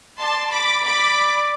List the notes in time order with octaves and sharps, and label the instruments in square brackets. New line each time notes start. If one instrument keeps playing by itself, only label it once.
[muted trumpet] D5 [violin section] A5 C6
[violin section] B5 D6
B5 D6